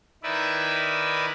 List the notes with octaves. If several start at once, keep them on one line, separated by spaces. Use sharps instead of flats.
D#3 D#4 E4 B4 D5 E5